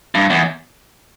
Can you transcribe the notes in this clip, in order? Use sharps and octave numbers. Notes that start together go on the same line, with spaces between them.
G2
E2